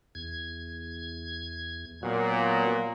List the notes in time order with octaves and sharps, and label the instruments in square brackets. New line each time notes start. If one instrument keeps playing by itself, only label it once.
[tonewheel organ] E2 G#6
[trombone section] A#2 [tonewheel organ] F#3 B3 F#4